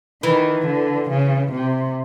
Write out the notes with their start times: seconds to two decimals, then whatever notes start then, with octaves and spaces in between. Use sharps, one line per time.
0.23 D#3 E3
0.66 D3
1.10 C#3
1.52 C3